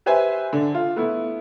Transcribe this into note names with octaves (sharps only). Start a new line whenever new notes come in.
G4 B4 C5 E5 G#5
D3 D4
F4
A3 B3 E4